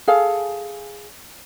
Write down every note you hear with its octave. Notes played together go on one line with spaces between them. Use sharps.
G#4 A4 F5